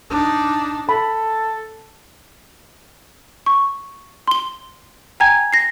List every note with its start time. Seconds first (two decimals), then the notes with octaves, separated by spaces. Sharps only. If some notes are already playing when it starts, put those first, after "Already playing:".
0.11 D4 D#4
0.89 A4 B5
3.46 C#6
4.27 C6 G7
5.20 G5 G#5 A#5 G#6
5.53 A#6 C7